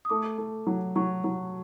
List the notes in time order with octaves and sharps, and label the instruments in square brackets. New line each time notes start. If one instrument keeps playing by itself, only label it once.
[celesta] D#6
[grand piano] A3 [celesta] D6
[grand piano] A3
F#3
[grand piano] F#3 [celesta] C#6
[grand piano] F#3